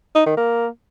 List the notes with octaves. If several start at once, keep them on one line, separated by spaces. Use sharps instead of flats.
D#4
D#3
A#3